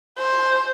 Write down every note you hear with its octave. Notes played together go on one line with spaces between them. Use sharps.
C5